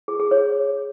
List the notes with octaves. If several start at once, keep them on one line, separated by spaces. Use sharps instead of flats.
G#4
G#4
C#5